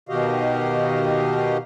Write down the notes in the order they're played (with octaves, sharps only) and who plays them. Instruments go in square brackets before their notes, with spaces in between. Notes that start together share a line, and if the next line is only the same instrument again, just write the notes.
[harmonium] B2 D#3 F#4 G4 D#5 F5